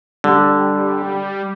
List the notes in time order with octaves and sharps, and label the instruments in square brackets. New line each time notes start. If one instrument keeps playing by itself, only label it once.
[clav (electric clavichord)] D3 [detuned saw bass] G3